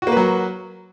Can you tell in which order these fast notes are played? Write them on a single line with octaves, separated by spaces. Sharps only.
F#4 A#3 B4 F#3